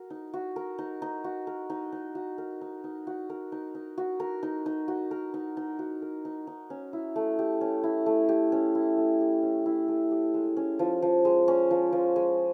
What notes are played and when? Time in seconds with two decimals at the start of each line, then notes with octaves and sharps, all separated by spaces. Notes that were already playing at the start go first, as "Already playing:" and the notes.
Already playing: F#4 A#4
0.10 D#4
0.34 F#4
0.56 A#4
0.79 D#4
1.02 D#4
1.24 F#4
1.47 A#4
1.70 D#4
1.92 D#4
2.15 F#4
2.38 A#4
2.61 D#4
2.84 D#4
3.07 F#4
3.30 A#4
3.52 D#4
3.75 D#4
3.98 F#4
4.20 A#4
4.43 D#4
4.66 D#4
4.88 F#4
5.11 A#4
5.34 D#4
5.57 D#4
5.79 F#4
6.02 A#4
6.25 D#4
6.47 D#4
6.70 C#4
6.93 E4
7.16 A3
7.39 G4
7.61 C#4
7.84 E4
8.06 A3
8.29 G4
8.52 C#4
8.75 E4
8.97 A3
9.21 G4
9.43 C#4
9.66 E4
9.88 A3
10.11 G4
10.34 G#3
10.57 C#4
10.79 F3
11.02 F3
11.25 G#3
11.48 C#4
11.71 F3
11.93 F3
12.16 G#3